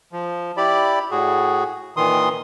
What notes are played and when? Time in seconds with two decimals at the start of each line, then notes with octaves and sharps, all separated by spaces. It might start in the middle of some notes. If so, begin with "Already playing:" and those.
0.13 F3
0.57 E4 G4 D5 B5
1.11 A2 F#4 G#4
1.97 A#2 D#3 E3 C6 D#6